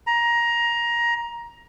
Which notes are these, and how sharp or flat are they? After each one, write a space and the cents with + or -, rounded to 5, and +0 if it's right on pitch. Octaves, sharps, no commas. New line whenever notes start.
A#5 +15